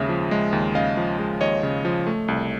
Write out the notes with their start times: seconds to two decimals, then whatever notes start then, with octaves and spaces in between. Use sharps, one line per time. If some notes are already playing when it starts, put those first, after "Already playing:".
Already playing: D#2 C#3 G#3 E5
0.09 F3
0.31 G#3
0.53 D#2
0.75 C#3 D#5 F5
0.97 F3
1.19 G#3
1.41 D#2 C#5 D#5
1.63 C#3
1.85 F3
2.06 A3
2.28 C2